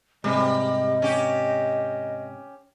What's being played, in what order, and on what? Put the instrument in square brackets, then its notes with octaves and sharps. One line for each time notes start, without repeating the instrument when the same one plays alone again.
[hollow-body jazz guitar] G#2 C3 [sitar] G3 [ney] D#5
[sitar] C#4 G4